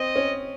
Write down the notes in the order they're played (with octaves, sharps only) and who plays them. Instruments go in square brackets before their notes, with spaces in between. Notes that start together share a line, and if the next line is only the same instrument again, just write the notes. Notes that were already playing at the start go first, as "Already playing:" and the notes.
Already playing: [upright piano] C4 [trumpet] D#5
[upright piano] C#4